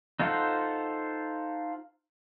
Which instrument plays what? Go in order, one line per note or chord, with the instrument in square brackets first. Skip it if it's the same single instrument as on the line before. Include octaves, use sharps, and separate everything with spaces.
[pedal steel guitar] D#4 F4 A4 C5 F#5